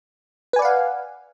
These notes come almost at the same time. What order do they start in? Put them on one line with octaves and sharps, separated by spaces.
B4 G#5 D5 F#5 F5